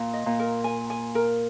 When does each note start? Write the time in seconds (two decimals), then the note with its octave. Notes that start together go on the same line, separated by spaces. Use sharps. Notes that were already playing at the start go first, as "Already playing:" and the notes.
Already playing: A#2
0.13 D#5
0.26 A#2
0.39 A#4
0.64 G#5
0.90 G#5
1.15 A#4